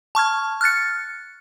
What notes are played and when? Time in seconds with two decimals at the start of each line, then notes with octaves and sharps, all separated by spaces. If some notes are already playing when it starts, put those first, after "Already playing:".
0.15 A5 C#6 F6 G#6
0.61 F6 F#6 A6 C#7